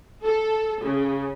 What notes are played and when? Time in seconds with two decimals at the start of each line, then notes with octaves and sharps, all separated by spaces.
0.24 A4
0.82 C#3